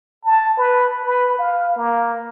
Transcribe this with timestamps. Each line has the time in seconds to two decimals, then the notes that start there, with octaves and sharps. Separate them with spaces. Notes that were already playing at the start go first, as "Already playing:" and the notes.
0.24 A5
0.57 B4
1.05 B4
1.38 F5
1.76 A#3